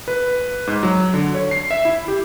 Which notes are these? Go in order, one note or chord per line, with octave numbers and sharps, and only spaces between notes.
B4
G#2
F#3
D3
C#5
C7
E5
E4
G4